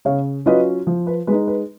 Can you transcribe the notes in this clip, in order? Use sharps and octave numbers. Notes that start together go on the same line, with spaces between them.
C#3 C#5 F5
F#3 C#4 F4 B4 D#5
F3
B4
G#3 D#4 B4
B4